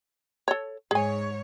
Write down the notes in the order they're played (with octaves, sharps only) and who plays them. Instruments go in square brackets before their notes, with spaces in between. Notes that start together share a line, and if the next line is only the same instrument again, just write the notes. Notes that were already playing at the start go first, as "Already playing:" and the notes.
[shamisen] A4 C#5
[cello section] G#2 C#5 [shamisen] G#4 G#5